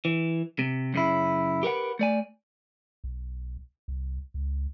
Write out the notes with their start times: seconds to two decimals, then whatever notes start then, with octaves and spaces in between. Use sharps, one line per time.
0.05 E3
0.59 C3
0.94 F#2 C#3 E4
1.63 G4 A#4 B4 F#5
1.99 A3 D5 G#5
3.04 B1
3.88 C2
4.34 C#2